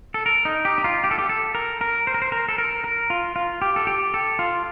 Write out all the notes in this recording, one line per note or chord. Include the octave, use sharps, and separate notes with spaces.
A4
A#4
D#4
G4
D#4
F4
G4
A4
G4
A4
A#4
A#4
C5
A#4
C5
A#4
A4
A#4
A#4
F4
F4
G4
A4
G4
A4
F4